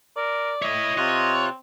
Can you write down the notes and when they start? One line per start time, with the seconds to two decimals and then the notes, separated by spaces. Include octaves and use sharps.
0.17 A#4 D5
0.62 E4 C#5 D#5
0.98 C3 C4 F4 C#5 F#6